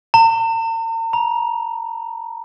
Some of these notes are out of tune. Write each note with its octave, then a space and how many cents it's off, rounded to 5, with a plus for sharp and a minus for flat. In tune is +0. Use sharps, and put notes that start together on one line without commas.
A#5 -45
A#5 +40